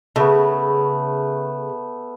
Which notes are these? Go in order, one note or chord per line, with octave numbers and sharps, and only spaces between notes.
C#3 A3 B3